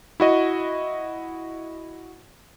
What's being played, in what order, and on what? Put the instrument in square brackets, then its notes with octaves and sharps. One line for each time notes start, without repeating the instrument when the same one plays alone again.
[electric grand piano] E4 F#4 D#5